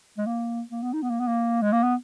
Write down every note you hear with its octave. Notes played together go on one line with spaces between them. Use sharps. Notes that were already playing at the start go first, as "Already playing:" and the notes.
G#3
A#3
A#3
B3
D#4
B3
A#3
B3
A#3
G#3
A#3
B3